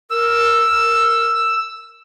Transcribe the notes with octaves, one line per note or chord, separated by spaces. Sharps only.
A#4 E6